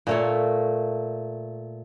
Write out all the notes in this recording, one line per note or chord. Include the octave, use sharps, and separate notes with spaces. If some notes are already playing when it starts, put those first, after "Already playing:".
A#2 A3 C#5